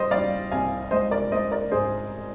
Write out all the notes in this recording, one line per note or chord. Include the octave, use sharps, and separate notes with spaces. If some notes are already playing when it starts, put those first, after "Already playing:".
Already playing: G3 C5 D#5
G3 D5 F5
C2 F5 G#5
G#3 C5 D#5
A#4 D5
G#3 C5 D#5
A#4 D5
G#2 G#4 C5